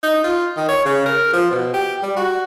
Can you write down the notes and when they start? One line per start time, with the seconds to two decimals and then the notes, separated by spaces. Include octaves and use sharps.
0.03 D#4
0.24 F4
0.56 D#3
0.68 C#5
0.85 C#3
1.06 A#4
1.33 F3
1.51 B2
1.74 G4
2.03 G3
2.16 F#4